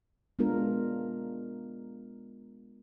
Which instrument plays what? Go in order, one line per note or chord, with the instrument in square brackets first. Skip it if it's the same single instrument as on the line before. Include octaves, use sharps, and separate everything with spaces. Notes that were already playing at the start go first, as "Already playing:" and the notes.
[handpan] G#3 B3 D4 F4 A#4